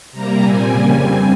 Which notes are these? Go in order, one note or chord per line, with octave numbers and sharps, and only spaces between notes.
C3 G3 A#3 A#5
A#2 G3 C4 G#5
F2 C#3 G3 A#3 G#5
G2 G3 C4